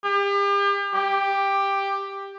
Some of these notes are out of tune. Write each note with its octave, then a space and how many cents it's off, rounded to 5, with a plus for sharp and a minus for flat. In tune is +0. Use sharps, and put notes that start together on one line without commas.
G4 +40
G4 +10